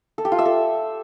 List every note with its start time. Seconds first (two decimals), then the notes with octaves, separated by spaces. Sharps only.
0.18 A4
0.25 G4
0.32 F4
0.39 E5
0.45 A4